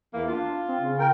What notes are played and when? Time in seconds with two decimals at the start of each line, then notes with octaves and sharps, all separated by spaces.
0.14 E2 E3 A#3
0.28 D4 F4
0.68 C4
0.80 C#3
0.99 A#4 G5